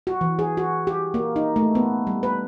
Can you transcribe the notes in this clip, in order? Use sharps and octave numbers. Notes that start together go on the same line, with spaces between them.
F#4
E3
G#4
F#4
G4
A#3
D#4
A3
B3
G3
B4